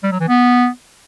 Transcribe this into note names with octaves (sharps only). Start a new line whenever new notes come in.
G3
F#3
E3
B3